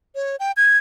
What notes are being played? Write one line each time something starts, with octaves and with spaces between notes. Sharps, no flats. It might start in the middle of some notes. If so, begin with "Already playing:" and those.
C#5
G5
G#6